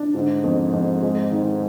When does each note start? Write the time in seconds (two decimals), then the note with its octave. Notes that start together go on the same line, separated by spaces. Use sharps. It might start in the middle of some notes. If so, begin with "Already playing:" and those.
Already playing: D4
0.15 G#2 D3
0.44 F2
0.73 F2
1.02 G#3
1.32 D#3